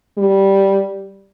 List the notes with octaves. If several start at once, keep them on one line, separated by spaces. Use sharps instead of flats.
G3